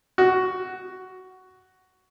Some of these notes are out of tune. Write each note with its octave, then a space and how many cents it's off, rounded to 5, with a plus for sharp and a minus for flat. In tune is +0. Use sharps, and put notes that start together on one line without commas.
F#4 +10